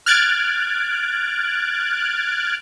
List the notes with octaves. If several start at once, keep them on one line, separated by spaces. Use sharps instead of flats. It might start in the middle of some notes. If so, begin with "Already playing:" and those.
F6 F#6 G#6 A6 D7